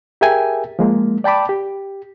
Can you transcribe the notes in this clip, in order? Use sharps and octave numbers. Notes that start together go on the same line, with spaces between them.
G4 G#4 A#4 E5 G5 G#5
F3 G#3 A#3
D5 G5 A5 B5 D6
G4